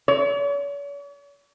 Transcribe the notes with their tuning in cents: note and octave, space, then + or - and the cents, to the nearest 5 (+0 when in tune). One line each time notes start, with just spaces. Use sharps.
C#5 +45